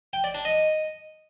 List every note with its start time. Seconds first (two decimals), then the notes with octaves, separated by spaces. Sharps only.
0.13 G5
0.24 D5
0.35 D4
0.45 D#5